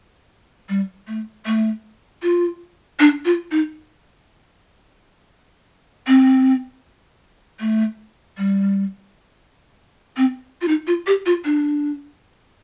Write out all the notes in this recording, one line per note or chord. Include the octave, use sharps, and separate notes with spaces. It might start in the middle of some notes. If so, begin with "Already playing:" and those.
G3
A3
A3
F4
D4
F4
D#4
C4
A3
G3
C4
F4
D#4
F4
G4
F4
D4